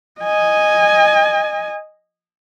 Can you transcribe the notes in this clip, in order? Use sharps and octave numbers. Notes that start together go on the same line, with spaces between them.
D#5 G#5